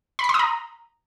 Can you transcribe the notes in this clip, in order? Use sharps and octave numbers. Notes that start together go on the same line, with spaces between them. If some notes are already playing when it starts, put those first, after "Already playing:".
B5
B6
C6
D#6
A#5